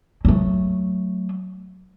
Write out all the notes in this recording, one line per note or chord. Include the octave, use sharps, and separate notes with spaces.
F#3 A3